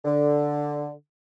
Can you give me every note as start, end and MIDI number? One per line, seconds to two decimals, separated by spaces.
0.05 0.90 50